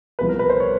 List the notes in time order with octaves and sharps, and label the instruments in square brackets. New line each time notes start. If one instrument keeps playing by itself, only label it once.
[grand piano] C2 C3 F3 G#3 B3 B4
A#4
B4
C5
C#5